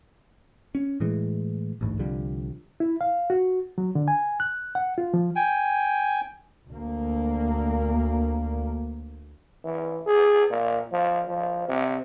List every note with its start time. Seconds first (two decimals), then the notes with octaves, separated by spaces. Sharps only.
0.75 C#4
1.00 A2 E3 G#3
1.81 A1 D2 G#2
1.99 C2 D3 F3 G3
2.80 E4
3.01 F5
3.30 F#4
3.78 F#3
3.95 D3
4.08 G#5
4.40 F#6
4.75 F#5
4.98 F4
5.14 F3
5.36 G5 G#5
6.71 D2 A#3
9.65 E3
10.06 G#4
10.50 A#2
10.93 F3
11.29 F3
11.68 C3